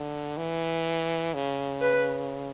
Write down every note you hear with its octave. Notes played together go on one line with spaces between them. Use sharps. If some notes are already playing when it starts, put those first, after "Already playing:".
Already playing: D3
E3
C#3
B4